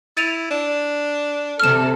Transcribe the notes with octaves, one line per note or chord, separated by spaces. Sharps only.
E4 A6 D#7 F7
D4
C3 A4 F6 E7